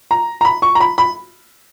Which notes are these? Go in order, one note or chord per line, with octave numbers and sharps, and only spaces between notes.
A#5
A#5
B5
C#6
A#5
B5
B5